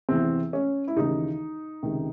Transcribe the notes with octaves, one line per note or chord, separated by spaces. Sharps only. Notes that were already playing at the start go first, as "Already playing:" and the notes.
E2 C3 E3 C4
C#4
E4
D#2 C#3 E3 D#4
C#2 C3 D#3